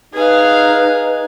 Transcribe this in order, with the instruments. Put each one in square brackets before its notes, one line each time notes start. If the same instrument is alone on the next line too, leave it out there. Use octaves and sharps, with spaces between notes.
[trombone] D#4 [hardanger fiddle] G#4 F5 [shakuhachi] B4